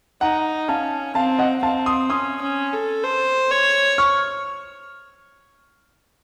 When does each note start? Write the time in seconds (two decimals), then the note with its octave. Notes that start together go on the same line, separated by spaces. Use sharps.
0.21 D#4 F#5 A#5
0.69 C#4 F5 A5
1.15 C4 F5 A5
1.39 D#5 F#5
1.62 C4 F5 A5
1.86 C6 D#6
2.10 C#4 C6 D#6
2.41 C#4
2.73 A4
3.04 C5
3.51 C#5
3.98 C#6 F6